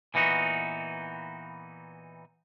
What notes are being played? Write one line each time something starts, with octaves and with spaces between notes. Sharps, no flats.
A#2 E3 B3 D#4 F#4